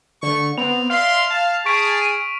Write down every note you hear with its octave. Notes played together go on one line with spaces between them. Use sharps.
D3 A3 C#6
B3 C4 F7
D5 E5 F5 C6 F6
F5 A5
G#4 C#6 B6 D7
D7 D#7